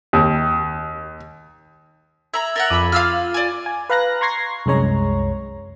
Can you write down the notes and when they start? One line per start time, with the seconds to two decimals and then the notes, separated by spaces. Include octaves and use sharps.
0.13 D#2
2.34 E5 A#5 G#6 F7 F#7
2.56 A#4 E5 F#5 A6 G7
2.70 F2 B5 D6 D#7 F#7
2.92 F4 F5 E6 F6
3.34 D5 G#5
3.66 G#5
3.89 B4 F5 A#5 F#6 A#6
4.21 A#5 C6 C#6 G#6 A#6 C7
4.66 C2 F#2 G#3 C#5 A#5